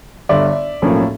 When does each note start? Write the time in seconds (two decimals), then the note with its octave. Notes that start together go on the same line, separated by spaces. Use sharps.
0.29 G1 G2 D3 D5 E5
0.82 B1 A2 F3 A#3 C#4